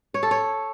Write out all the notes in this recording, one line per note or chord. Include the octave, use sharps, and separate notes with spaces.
C#5
A4
C#5